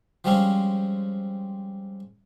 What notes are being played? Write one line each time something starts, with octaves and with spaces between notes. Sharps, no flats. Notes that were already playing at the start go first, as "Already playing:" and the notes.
F3 G3 G#3 C4 C#4 F4